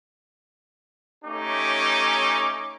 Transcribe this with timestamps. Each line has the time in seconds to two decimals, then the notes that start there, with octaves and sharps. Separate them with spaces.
1.25 A3 C#4 D#4 G4 C#5 D6